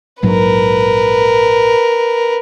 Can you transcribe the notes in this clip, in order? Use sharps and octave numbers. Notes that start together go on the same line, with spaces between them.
A#1 G#2 F#3 A#4 B4